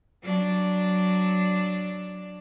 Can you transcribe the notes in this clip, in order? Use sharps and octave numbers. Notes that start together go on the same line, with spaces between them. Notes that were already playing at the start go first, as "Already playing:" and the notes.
F#3 D4